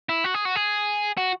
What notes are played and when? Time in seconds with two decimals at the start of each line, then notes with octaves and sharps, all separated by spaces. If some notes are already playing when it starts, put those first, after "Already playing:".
0.09 E4
0.24 F#4
0.34 G#4
0.45 F#4
0.56 G#4
1.18 F#4